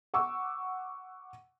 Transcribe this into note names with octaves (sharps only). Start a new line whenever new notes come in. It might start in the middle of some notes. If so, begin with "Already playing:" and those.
F#5 C#6 D6 E6